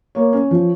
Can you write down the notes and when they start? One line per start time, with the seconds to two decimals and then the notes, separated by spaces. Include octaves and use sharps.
0.15 A#3 C#5
0.33 C#4
0.51 F3